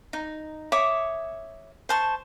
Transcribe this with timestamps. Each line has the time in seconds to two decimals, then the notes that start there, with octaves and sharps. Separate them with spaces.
0.13 D#4
0.72 C#5 E5 D6 D#6
1.89 C5 A5 C#6